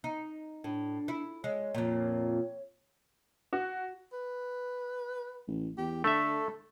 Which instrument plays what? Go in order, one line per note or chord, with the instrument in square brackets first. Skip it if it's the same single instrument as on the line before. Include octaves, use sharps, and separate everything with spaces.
[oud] D#4
[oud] A2 [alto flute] D4
[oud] E4
[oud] G#3 [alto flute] C#5
[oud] F2 A#2
[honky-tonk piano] F#4
[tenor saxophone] B4
[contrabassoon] A1
[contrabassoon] E2 [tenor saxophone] G4
[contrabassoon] D3 [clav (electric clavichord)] A3 E5 [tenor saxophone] A4